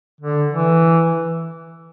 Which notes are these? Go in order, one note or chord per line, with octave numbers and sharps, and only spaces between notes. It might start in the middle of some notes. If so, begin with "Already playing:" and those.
D3
E3